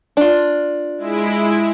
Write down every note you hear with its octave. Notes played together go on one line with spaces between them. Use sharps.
D4 F4
G#3 E4 D7